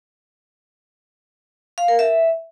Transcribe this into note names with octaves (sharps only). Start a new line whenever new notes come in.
F5
A#4
E5